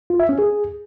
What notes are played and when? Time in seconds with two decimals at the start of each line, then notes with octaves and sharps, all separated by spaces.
0.10 F4
0.20 E5
0.29 C#4
0.39 G#4